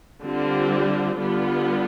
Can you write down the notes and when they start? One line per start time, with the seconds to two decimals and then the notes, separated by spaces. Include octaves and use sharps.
0.23 D3 G3 C4 F4
1.18 D3 G3 B3 F4